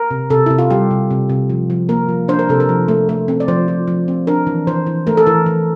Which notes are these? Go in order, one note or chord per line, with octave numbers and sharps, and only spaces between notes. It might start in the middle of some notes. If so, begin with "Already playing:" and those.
Already playing: A#4
C3
C3 A4
C3 E4
F4
G3 G4
C3
C3
C3
F3
F3
A#3 A#4
F3
D4 C5
A#4
C3 A4
A#4
F3
A3
A3
C4
D5
F3 C5
F3
F3
C4
D4 A#4
E3
E3 C5
E3
A3 A#4
A4
E3 A#4
E3